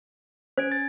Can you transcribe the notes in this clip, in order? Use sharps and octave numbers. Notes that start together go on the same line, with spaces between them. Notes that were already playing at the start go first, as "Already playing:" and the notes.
C#4 C5 G#6 D7
A6